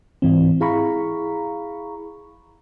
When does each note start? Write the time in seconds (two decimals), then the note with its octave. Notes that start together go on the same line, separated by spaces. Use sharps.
0.22 G#2 E3 C4
0.60 E4 G#4 F5 A#5 B5 C#6